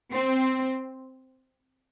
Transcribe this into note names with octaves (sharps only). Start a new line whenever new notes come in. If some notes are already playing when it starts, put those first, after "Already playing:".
C4